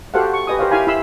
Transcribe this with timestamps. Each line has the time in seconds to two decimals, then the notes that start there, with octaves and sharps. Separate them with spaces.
0.14 F#4 G4 A4 C5 F5 F#5
0.33 C#6
0.47 G4 B4 D#5 G#5 D#6
0.59 G4 A#4 C5 C#5 F5
0.71 E4 G4 F5 G#5 B5
0.87 E4 B5 C6 E6